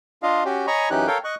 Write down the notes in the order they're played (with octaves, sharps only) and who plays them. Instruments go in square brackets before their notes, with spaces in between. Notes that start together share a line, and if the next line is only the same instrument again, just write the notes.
[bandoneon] D4 F4 D#5 F5
C#4 F#4 G4
C#5 D#5 G#5 A#5 B5 C#6
F#2 E3 C#4 D#4 G4 F#6
A4 A#4 C#5 F5 G5
D#5 C#6 F#6